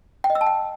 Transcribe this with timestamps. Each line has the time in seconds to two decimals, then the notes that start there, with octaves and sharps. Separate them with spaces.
0.24 G5
0.30 D#5
0.35 E6
0.41 A5
0.47 G5